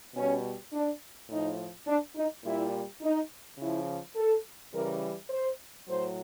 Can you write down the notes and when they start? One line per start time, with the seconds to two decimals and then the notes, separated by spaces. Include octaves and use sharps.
0.15 B2 G3 C#4
0.72 D4
1.29 A2 F3 D#4
1.87 D4
2.16 D#4
2.44 A#2 G3 E4
3.01 D#4
3.58 C#3 F3 E4
4.16 A4
4.73 C#3 E3 G3 A#4
5.30 C5
5.87 A2 F#3 C5